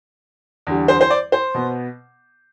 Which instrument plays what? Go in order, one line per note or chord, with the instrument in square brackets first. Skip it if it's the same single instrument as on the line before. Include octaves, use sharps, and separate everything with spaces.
[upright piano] E2 D3 G3
C5
C5
D5
C5
B2 B3